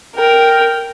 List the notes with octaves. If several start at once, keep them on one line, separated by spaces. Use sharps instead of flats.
A#4 G5